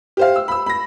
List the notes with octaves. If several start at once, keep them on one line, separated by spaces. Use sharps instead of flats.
G4 C5 F5
E6
B5 E6
B5 A#6